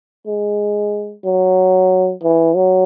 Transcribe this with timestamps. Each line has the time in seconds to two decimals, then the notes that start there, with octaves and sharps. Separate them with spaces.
0.27 G#3
1.25 F#3
2.23 E3
2.55 F#3